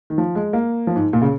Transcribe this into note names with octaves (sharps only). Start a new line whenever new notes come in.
D#3
F3
G#3
A#3
F3
G#2
A#2
C#3